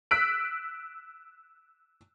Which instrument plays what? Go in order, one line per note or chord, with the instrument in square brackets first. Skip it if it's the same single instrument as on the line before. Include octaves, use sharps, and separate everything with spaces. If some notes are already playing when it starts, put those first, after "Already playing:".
[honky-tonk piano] E6 F#6 B6 D7